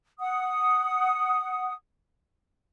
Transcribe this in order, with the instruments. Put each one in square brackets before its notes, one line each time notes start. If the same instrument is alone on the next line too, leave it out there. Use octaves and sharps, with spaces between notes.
[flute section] F#5 D#6